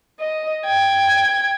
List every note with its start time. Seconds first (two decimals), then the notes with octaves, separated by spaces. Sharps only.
0.20 D#5
0.66 G5 G#6